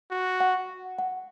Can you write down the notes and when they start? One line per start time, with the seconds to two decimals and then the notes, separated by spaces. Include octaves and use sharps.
0.11 F#4
0.40 F#5
0.99 F#5